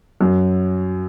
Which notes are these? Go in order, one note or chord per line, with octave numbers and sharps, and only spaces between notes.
F#2 F#3